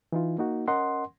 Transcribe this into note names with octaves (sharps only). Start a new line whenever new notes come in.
E3 D#4 F4
A#3 D#4 F#4
C#4 A#4 D#5 F#5 C6